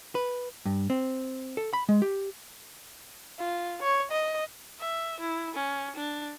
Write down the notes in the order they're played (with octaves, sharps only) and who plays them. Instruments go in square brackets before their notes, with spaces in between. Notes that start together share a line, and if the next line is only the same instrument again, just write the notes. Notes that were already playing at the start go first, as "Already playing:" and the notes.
[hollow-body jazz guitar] B4
G2
C4
A4
B5
G#3
G4
[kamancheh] F4
C#5
D#5
E5
E4
C#4
D4